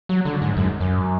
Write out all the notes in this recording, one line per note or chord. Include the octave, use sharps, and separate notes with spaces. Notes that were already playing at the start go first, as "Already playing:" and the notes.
F#3
D3
G#2
F#2
F#2